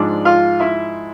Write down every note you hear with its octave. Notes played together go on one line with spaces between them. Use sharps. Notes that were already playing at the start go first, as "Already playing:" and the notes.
Already playing: G#2 F3 D4 D5
F4 F5
E4 E5